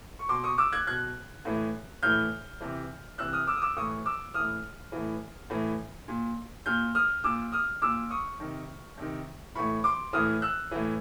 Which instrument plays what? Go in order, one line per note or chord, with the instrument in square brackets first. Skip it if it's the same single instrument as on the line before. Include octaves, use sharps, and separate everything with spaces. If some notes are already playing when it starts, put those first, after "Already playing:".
[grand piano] C#6
B2 C6 D6
C#6 D#6
D6 E6
F#6 G#6
B2 F#6 G#6
A2 E3
A2 E3 F6 G6
C3 E3
C3 E3 E6 F#6
D#6 F6
D6 E6
D#6
D6 E6
A2 E3 C#6 D#6
D6 E6
A2 E3 D#6 F6
A2 E3
A2 E3
A#2
A#2 F6 G6
D#6 F6
A#2 D6 E6
D#6 F6
A#2 D6 E6
C#6 D#6
C3 D#3
C3 D#3
A2 E3 B5 C#6
C6 D6
A2 E3 D#6 F6
E6 F#6
A2 E3